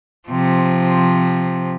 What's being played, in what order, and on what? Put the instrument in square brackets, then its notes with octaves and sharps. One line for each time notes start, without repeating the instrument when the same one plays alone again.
[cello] C3 F3